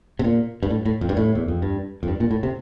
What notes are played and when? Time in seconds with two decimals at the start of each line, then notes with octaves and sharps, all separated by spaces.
0.19 C3
0.24 A#2
0.63 G2
0.70 A2
0.85 A2
1.01 F2
1.09 G2
1.17 A2
1.35 E2
1.48 F2
1.62 G2
2.03 F2
2.08 G2
2.20 A#2
2.31 A2
2.43 C3